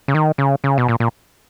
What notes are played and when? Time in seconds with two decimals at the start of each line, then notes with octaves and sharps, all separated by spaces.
0.08 C#3
0.14 D#3
0.38 C#3
0.64 C#3
0.78 B2
0.88 A#2
1.00 A#2